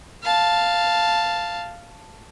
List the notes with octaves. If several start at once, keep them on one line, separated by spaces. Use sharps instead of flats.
F5 A5